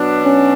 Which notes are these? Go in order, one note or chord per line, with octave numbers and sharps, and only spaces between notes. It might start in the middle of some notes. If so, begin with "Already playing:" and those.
Already playing: B2 F#3 B3 D4
C#4